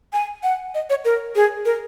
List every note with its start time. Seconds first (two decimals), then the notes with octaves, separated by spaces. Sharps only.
0.13 G#5
0.43 F#5
0.75 D#5
0.90 C#5
1.05 A#4
1.36 G#4
1.65 A#4